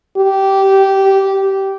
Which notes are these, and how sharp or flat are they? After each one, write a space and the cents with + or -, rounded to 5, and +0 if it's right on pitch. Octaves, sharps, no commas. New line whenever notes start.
G4 -15